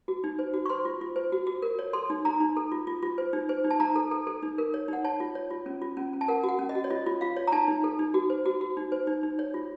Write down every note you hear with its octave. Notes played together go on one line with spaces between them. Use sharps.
F#4
D#4
C5
F#4
C#6
C5 C6
F4
F4
C5
F#4
F#4
A#4
C#5
A4 C6
D#4
D#4 A#5
D#4
A4
F4
F4
F4
C5
D#4
C5
D#4
A5
D#4 A#5
A4
A4
A4
D#4
A#4
C#5
D#4 F#5
C#5 A5
F4
C#5
F4
C#4
F4
C#4
C#4
A5
A#4 F#5
F#4
F#5
C#4
D#5
F#4
C#5
F4 D#5
F4
F4 F5
C#5
A#5
D#4 A5
D#4
A4
D#4
F#4
C5
F#4
F#4
D#4
C5
D#4
D#4
C#5
F4